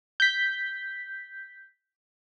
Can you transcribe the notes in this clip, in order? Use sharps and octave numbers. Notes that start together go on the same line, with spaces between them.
G6 B6